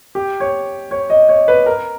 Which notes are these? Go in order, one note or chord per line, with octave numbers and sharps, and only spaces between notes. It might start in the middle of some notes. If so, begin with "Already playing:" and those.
G4
C#5
C#5
D#5
C#5
B4
A#4